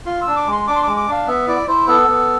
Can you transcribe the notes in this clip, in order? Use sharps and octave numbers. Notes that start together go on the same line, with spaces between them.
F4 C6
E6
D4
D6
G#3
C6
D4 D6
C6
G#3 D6
D6
D4 F5
B3 E5
E4 D5
E4 C5
B3 A4
B3